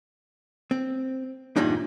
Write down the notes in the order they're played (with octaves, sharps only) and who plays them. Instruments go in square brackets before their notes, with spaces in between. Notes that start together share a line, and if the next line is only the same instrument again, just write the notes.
[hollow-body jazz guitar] C4
E2 G2 A#2 G3 D4 D#4